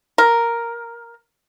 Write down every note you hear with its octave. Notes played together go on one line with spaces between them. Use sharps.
A#4